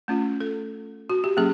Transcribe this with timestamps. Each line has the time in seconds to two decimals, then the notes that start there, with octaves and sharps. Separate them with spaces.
0.08 A3 C#4 F4
0.40 A4
1.10 F#4
1.24 G4
1.37 F#3 A#3 C#4 G#4